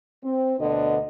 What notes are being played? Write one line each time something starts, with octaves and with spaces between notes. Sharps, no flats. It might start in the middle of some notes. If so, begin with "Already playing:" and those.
C4
D2 B2 D3 D#5